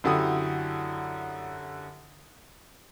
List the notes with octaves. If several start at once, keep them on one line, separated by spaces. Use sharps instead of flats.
F#2 D3 E4 F#4 G4 D#6